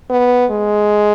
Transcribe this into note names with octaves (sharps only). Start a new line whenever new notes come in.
B3
G#3